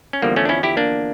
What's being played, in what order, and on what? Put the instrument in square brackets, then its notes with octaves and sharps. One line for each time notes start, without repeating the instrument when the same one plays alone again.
[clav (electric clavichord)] C#4
E2 D3 F3 G3 A#3
A3 C#4
D4
C#4 E4
E4 G4
A#3 D4